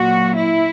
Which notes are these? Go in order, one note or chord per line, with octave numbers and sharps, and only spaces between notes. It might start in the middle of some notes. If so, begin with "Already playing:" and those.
Already playing: A#2 F#3 A#3 F#4
E4